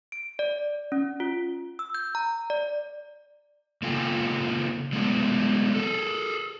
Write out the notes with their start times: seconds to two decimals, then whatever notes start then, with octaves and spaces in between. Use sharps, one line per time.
0.12 D7
0.39 D5
0.92 C#4
1.20 F4
1.79 E6
1.95 G6
2.15 A#5
2.50 D5
3.82 C#3 A#3 F4 A4 G5 G#5
4.93 F#3 G#3 A3 B3 D4 E4
5.75 G#4 A4